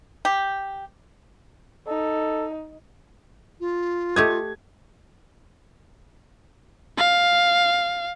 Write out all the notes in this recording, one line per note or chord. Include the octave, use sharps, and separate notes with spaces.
G4
D#4 A4
F4
A3 G4 D#5 G#6
F5